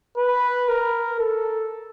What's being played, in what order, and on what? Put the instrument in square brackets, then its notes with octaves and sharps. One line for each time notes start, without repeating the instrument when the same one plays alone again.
[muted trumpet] B4
A#4
A4